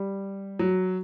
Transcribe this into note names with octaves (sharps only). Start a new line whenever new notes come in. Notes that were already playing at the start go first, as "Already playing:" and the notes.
Already playing: G3
F#3